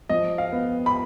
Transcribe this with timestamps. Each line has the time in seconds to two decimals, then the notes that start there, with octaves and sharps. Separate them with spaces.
0.09 F3 D#5
0.38 F5
0.52 B3
0.86 B5